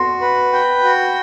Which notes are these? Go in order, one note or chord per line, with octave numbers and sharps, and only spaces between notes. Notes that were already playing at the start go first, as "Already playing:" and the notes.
Already playing: F#4 C6
B4
G5
F#4